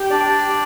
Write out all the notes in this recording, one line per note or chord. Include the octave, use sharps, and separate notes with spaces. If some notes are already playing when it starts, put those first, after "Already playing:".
Already playing: G4
D4 D5